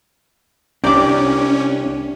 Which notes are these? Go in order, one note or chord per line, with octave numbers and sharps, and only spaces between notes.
C2 C#4 D4 G4 D5 G5 A#5 D6